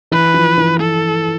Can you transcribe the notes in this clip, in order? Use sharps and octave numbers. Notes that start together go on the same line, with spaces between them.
E3 B4
F3
E3
A4